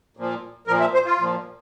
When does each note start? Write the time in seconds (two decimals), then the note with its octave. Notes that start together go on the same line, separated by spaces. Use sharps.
0.17 A#2 F3
0.67 A#2 F3 A#4
0.80 E5
0.94 C5
1.05 F4
1.18 A#2 F3